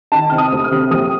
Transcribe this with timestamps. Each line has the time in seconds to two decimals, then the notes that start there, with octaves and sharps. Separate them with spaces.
0.12 D#3 A5
0.30 C3 F6
0.38 D#6
0.52 D2
0.64 F6
0.71 C3
0.91 A#1 D#6